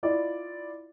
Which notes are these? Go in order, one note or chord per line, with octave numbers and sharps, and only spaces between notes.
E4 F4 D5 D#5